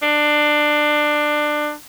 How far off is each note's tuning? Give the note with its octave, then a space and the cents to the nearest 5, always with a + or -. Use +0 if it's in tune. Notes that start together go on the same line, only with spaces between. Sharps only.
D4 +20